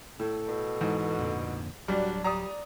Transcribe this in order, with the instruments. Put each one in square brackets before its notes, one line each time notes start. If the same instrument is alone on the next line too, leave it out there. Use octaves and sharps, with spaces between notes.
[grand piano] A2 [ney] A4
[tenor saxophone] B2
[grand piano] G#2 [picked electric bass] E3
[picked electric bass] F2 A#2 D3
[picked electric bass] D1 B1 F#3 [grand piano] G3 [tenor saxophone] D4 [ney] F#4
[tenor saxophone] G3 [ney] D5 [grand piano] A#5 D#6